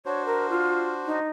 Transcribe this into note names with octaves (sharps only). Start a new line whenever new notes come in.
D4 F#4 C5 C#5
A#4
F4
D#4